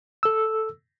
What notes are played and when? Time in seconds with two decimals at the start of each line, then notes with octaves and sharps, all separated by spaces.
0.23 A4 E6